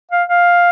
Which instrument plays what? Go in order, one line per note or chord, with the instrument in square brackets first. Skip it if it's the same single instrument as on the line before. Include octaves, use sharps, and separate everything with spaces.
[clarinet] F5
F5